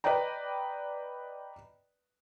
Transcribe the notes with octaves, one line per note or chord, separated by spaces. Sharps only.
B4 D5 D#5 G5 A#5